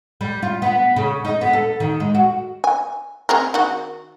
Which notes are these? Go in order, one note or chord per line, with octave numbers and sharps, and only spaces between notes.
G3
F4
B3
C#3
D#4
B3
A4
D#3
G#3
F#4
G#5
C4 G#4 A#4
D#3 F#4